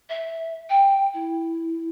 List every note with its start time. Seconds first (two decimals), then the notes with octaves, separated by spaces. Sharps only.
0.09 E5
0.69 G5
1.14 E4